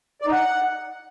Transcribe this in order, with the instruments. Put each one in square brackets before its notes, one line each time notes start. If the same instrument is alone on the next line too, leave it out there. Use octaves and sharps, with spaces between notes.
[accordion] D5
D#4
F#5